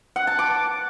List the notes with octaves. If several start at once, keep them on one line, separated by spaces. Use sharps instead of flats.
F#5
A5
D6